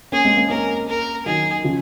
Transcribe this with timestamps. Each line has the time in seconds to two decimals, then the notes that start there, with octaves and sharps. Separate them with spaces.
0.12 A#3 C#4 G#4
0.25 G#3 C4
0.37 A#3 C#4
0.50 A#3 C#4 A#4
0.88 A#4
1.26 D#3 F#3 G#4
1.64 C#3 F3